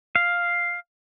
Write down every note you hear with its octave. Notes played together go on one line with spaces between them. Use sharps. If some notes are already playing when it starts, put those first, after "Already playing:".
F5